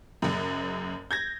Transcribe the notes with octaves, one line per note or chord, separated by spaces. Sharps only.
F#1 F#2
G6 G#6 A#6